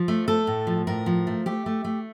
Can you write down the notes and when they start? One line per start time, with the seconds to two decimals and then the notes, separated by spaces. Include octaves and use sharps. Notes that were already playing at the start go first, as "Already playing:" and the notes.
Already playing: F3
0.08 A3
0.28 A3 A4
0.47 A2
0.67 F3
0.87 A2 A#4
1.06 F3
1.27 A3
1.46 A3 G4
1.66 A3
1.84 A3